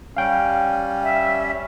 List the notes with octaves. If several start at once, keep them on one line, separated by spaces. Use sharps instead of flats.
G3 C#4 F5 G5
E5